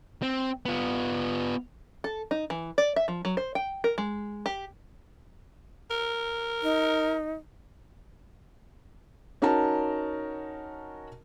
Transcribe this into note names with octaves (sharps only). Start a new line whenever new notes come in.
C4
B3 F4
A4
D#4
E3
D5
E5
F3
F#3
C5
G5
A#4
G#3
G4
A#4
D#4
C#4 D#4 F#4 A#4 A5